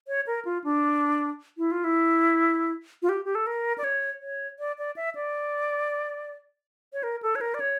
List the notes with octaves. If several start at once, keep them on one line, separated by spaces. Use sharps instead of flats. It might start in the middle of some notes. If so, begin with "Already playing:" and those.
C#5
A#4
F4
D4
E4
F4
E4
F4
G4
G4
A4
A#4
D5
C#5
C#5
D5
D5
E5
D5
C#5
A#4
A4
C#5
A#4
D5
C#5